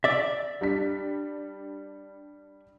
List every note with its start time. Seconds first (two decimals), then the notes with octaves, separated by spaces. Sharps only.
0.04 D5 E5
0.61 G3 D4 B6